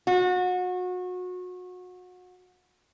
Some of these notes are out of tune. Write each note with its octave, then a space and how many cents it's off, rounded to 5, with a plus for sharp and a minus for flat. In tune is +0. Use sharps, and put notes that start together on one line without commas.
F#4 -30